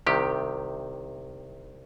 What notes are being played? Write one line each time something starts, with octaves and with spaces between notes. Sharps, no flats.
C2 C3 D#3 G4